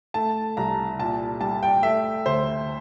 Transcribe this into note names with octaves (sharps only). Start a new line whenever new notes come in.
A3 A5
C2 A#5
A#2 A5
G3 A5
G5
A3 E5
D2 C5